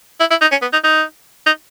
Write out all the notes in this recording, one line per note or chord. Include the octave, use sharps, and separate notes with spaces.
E4
E4
D#4
C#4
B3
D#4
D#4
D#4